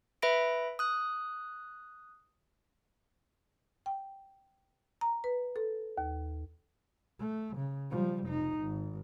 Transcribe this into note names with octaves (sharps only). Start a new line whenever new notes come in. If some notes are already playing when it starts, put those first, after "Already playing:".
B4 E5 B5 A#6 D7
D#6 F#6
G5
A#5
B4
A4
D#2
A3
C#3
F3 G3
F1 D#4
G#1